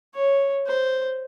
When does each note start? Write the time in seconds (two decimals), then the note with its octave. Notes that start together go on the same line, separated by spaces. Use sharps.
0.15 C#5
0.67 C5